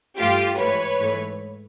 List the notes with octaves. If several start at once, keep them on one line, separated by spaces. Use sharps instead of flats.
G2 E3 A3 F4 G4
G#2 E3 A3 B4 C#5
G#2 E3 A3